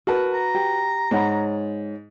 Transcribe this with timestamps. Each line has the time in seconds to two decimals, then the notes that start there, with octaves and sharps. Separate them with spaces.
0.07 F#4 A#4 B4 F#5 A5
0.34 A#5
0.55 G4
1.11 G#2 C#5 F#5 B5